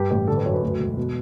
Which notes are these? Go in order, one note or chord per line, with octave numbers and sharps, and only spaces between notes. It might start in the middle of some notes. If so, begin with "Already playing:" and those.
Already playing: G2 G4
A1 G4
D3 A4
B4
F#2 C#5
B4
D2
E1
B2